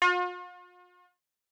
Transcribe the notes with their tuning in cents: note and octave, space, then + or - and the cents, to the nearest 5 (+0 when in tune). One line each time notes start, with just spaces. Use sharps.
F4 +45